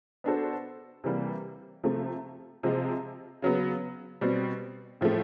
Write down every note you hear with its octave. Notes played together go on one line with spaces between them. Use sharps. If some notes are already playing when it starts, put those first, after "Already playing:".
B3 D4 F#4 A4 C5
C3 E3 G3 A#3
C3 F3 A3
C3 F3 G#3 C4
C#3 F#3 B3
B2 G3 C4
A2 F3 A3